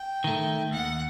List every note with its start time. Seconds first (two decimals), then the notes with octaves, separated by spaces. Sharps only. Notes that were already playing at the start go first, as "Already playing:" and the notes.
Already playing: G5
0.24 D#3 A3
0.71 D#2 F#5